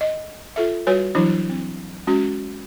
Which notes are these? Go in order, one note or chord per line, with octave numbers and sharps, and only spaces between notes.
D#5
F4 A4 E5
G3 F#4 B4 C#5 G#5
E3 F#3 D4 E4
C4
G#3 C#4 F#4